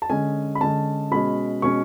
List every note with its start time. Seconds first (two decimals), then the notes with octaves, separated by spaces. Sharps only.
0.02 A5
0.10 D3 G#3 C#4 G#5
0.55 B5
0.61 D3 G#3 C#4 A5
1.11 B2 G#3 C#4 B5
1.62 B2 G#3 C#4 C#6